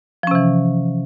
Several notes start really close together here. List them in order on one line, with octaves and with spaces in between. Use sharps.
F3 C#4 C3 E3